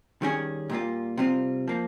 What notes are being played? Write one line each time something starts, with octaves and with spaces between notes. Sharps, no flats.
D#3 G3 C#4 G#4
A#2 G3 A#3 F4
C3 G3 C4 F4
F3 A#3